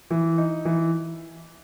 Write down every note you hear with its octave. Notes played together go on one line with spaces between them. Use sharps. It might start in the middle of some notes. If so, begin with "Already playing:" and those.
E3
D#4
E3